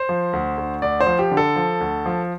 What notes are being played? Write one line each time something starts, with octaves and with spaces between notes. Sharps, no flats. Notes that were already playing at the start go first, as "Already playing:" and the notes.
Already playing: C5
F3
D2
D2
D2 D5
C5
F3
G4
D3
A4
F3
D2
F3